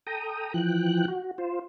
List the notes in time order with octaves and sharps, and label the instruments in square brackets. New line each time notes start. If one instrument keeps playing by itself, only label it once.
[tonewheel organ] A4 G5 A#5 D#6
E3 F3 G5 F#6
F#4
F4 C5